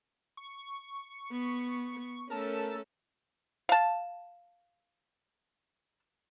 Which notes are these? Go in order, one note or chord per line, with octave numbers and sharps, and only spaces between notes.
C#6
B3
A3 C#4 A#4 A5 E6
F5 A5